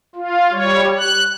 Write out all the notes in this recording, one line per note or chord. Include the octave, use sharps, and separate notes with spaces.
F4
G3 C#5
F#6